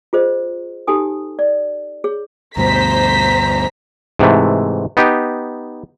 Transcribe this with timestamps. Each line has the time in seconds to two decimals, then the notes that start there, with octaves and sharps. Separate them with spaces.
0.13 F4 G#4 C5 D#5
0.87 D#4 G4 A4 G#5 D#6
1.39 D5
2.04 G#4 C#5
2.57 D2 G2 B2 C5 A#5 B6
4.19 G#2 C3 E3 A3
4.97 B3 D#4 G4